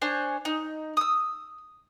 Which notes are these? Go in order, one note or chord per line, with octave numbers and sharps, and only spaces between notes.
D4 C5 C#5 G#5
D#4
D#6 E6